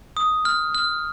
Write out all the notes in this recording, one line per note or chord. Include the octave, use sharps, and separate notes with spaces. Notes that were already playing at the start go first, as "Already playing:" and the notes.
D#6
F6
F6